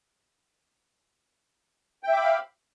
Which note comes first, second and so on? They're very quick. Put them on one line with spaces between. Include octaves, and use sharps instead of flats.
G5 E5 D6 B5 F5